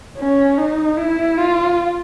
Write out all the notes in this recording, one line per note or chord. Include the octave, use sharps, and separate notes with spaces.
C#4
D#4
E4
F4